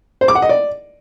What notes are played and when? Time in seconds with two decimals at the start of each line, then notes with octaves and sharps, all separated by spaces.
0.21 C5
0.28 D6
0.35 F#5
0.42 D#5
0.49 D5